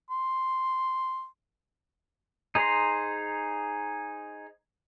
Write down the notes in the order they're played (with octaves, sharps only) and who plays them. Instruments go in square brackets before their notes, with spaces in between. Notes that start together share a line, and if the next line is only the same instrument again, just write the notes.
[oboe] C6
[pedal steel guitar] D#4 G#4 C5 A#5 C6